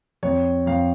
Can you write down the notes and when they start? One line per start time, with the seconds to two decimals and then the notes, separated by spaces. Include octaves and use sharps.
0.23 F2 C#5
0.66 F2 F5